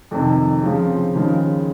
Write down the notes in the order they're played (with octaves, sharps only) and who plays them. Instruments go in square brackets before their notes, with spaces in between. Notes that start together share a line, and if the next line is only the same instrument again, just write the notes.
[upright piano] F2 C3 D#3
C#3 F3 C4
D#2 C#3 F3 G#3